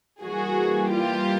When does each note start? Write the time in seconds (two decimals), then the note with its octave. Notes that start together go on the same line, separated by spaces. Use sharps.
0.22 E3 G3 A#3 F#4 G#4
0.90 F4 G4